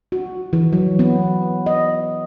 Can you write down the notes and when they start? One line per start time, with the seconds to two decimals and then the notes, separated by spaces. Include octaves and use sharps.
0.12 F#4
0.53 E3
0.73 F#3
0.99 B3
1.66 D#5